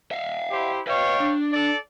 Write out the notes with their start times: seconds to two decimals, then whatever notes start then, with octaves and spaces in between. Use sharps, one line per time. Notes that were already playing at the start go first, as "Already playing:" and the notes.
0.11 E5 F5
0.52 E4 G4 C5
0.87 B4 C#5 D#5 F5 G5
1.20 D4
1.52 A4 D5